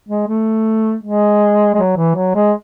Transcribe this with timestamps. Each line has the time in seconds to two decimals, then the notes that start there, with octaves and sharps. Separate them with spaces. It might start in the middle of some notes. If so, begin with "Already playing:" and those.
0.09 G#3
0.27 A3
1.03 G#3
1.74 G#3
1.78 F#3
1.97 E3
2.15 F#3
2.35 G#3